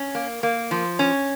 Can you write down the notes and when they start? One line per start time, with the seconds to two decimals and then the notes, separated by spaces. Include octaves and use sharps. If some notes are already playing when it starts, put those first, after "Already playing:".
Already playing: C#4
0.15 A#3
0.43 A#3
0.71 F3
0.99 C#4